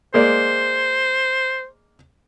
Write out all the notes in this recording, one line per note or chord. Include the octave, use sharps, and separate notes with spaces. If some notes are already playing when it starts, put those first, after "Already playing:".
G#3 A#3 C5 D5